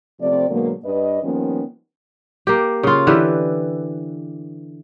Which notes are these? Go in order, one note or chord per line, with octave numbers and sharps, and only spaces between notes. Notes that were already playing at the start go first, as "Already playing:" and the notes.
C3 F3 A3 C4 D5
B2 D3 F#3 G#3 A#3
G2 B4 D5 D#5
D#3 F3 G3 A#3 B3 C#4
A#3 G4
C#3 F4
D3 E3 G4 B4